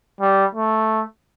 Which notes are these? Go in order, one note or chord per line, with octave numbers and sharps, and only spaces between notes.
G3
A3